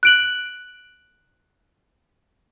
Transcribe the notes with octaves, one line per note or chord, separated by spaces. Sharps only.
F#6 D7 F#7